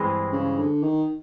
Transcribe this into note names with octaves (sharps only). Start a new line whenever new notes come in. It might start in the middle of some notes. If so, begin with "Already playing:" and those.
Already playing: G2 E3 G#3 C4
C#3
D3
D#3